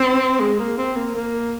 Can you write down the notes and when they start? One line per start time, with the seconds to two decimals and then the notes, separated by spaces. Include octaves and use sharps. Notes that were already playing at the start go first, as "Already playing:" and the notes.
Already playing: C4
0.40 G#3
0.59 A#3
0.78 C4
0.96 A#3
1.15 A#3